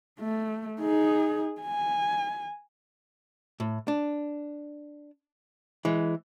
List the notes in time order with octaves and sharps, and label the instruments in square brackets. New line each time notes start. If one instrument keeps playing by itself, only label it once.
[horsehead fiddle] A3
D#4 G#4
G#5
[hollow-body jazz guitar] A2
D4
E3 G#3